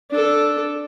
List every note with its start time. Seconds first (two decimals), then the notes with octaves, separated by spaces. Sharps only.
0.11 D4 A4